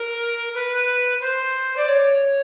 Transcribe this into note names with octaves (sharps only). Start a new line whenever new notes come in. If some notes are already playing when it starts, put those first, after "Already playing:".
Already playing: A#4
B4
C5
D5
C#5